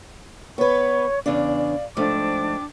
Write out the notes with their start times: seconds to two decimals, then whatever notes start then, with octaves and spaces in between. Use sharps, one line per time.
0.58 B3 B4 C#5 C#6
1.26 E2 C#3 D4 D5 F5
1.97 G#2 F3 A3 D4 G5 D6